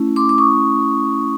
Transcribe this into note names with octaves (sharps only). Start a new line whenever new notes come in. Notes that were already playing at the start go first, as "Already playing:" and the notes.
Already playing: A3 C#4 E4
C6 D6
D6
C#6 D#6